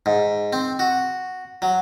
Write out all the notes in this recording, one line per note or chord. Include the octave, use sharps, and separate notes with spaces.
G#2
C4
F#4
F#3